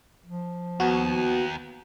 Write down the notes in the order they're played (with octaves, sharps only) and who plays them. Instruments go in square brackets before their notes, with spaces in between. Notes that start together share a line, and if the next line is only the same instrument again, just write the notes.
[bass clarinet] F3
[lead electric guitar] D#2 [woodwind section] B3 [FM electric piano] F#4